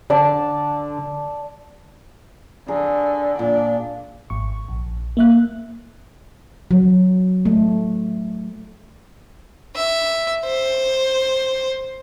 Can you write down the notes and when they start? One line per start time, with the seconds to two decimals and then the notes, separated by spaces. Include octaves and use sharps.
0.10 D3 D5 A5
2.68 D3 G#4 A#4
3.39 A#2 D4
4.30 G#1 C#6
4.68 A#1
5.17 A#3 E5 F#6
6.71 F#3
7.45 A3
9.76 E5
10.46 C5